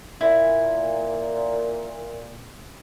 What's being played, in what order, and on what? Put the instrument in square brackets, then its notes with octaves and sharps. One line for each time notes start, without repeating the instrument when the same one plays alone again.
[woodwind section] A#2 [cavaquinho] E4